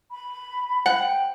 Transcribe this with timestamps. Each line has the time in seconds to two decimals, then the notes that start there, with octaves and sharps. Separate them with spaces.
0.11 B5
0.86 F#5
0.98 G5